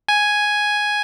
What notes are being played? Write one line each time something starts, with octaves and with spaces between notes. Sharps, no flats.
G#5